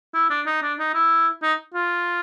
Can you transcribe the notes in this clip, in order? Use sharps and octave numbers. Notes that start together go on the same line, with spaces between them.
E4
D4
D#4
D4
D#4
E4
D#4
F4